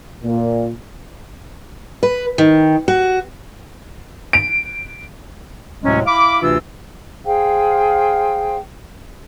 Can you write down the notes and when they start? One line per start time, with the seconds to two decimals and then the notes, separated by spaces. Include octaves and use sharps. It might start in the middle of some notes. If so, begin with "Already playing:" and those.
0.24 A#2
2.03 B4
2.38 D#3
2.88 F#4
4.33 D7
5.83 D2 A2 C3 F#3 G#3 C#4
6.06 E4 F5 B5 D6
6.41 D2 C3 E3 D4 F4 E6
7.26 G#4 C5 F5 G5